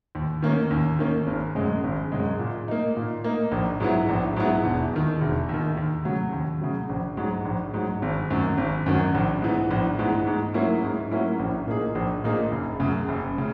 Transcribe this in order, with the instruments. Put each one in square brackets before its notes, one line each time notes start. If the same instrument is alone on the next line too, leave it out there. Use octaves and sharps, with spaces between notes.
[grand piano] D#2
D#3 A#3 C#4
D#2
D#3 A#3 C#4
G#1
F#2 C#3 G#3
G#1
F#2 C#3 G#3
A#2
A#3 D#4
A#2
A#3 D#4
A#1
G#2 F#3 B3 E4
A#1
G#2 F#3 B3 E4
E1
D#2 D#3
E1
D#2 D#3
D#2
C#3 F#3
D#2
C#3 F#3
A#1
G#2 F#3
A#1
G#2 F#3
G#1
F#2 D#3 F#3
G#1
F#2 D#3 F#3
A#1
G#2 E3 B3
A#1
G#2 E3 B3
G#2
F#3 A#3 C#4 E4
G#2
F#3 A#3 C#4 E4
A#1
A#2 A#3 D#4 G#4
A#1
A#2 A#3 D#4 G#4
F#1
F#2 C#3
F#1
C#3